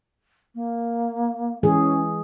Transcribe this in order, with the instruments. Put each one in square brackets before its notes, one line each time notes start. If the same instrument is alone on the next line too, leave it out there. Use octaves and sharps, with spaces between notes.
[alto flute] A#3
[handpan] E3 G#3 G#4 [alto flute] C#4